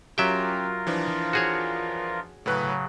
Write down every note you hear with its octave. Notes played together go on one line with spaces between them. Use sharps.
F#3 C#4 F4 G4 A#4 E5 G5
E3 F3 D4
F#4 G#4 C#5
A2 C#3 F#3 B4 F#6